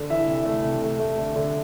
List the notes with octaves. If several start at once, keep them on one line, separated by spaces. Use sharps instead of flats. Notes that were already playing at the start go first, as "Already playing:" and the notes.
Already playing: D3
E3 E5
C3
A3
C3
A3
A3
D3
D3